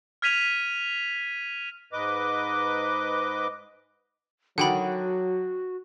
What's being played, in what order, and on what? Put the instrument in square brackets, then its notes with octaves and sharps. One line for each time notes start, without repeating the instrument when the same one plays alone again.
[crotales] F6 G#6 B6 D#7 F7
[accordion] G#2 B4 D#5 D6
[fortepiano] D3 D#3 [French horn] F#3 [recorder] F#4 [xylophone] F#5 G5 B5